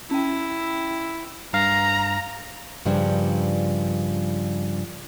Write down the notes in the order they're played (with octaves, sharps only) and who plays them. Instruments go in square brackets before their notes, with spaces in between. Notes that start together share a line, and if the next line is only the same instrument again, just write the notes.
[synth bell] C#4 G5 [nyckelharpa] E4
[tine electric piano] G2 F5 [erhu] A#5
[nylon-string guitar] G2 C#3 F3 G3 D4